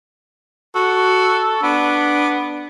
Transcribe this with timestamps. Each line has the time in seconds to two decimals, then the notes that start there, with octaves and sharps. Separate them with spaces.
0.75 F#4 A4
1.63 B3 D4